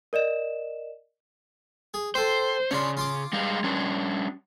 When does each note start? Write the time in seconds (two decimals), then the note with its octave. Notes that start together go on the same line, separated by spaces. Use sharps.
0.13 A#4 D5 D#5 E7
1.94 G#4
2.15 C4 A4 C5
2.71 C#3 C#4 D4 F4
2.97 F4 C6 D6
3.33 G3 G#3 F5
3.64 G3 C#4 D4